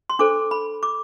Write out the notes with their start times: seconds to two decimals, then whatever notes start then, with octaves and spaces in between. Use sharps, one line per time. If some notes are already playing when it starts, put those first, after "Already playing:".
0.10 C6
0.19 D4 A4 C5 D6
0.51 B5
0.83 D6